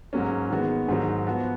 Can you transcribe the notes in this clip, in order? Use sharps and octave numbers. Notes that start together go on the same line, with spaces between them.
G#2 F#3 A#3 C#4
D#3 G#3 B3 F#4
G#2 D#3 F#3
F3 B3 F#4